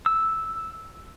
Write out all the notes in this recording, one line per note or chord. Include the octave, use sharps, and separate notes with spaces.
E6